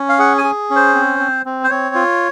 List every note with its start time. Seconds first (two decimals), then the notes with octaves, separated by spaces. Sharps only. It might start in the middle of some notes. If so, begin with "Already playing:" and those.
Already playing: C#4
0.09 F5
0.19 G#4 F#5
0.38 G#5
0.44 G#4
0.70 C#4
0.76 C5
0.94 C4
1.20 C4
1.45 C4
1.64 C5
1.70 C4 C#5
1.95 F4